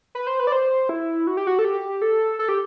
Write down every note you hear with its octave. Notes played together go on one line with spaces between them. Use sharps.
B4
C5
B4
D5
C5
E4
F#4
G4
F#4
A4
G4
A4
A4
G4